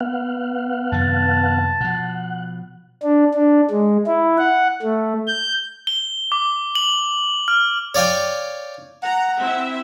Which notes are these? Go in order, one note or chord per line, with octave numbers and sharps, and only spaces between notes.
B3 F5 F#5
F#2 C3 D#3 A5
B2 F3 F#5
D4
D4
G#3
E4
F#5
A3
G6
G7
D6
F#7
F6
C#5 D5 F5 G5 G#5
F#5 A#5
C4 E4 E5